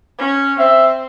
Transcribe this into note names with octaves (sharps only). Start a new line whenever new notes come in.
C#4
C4 E5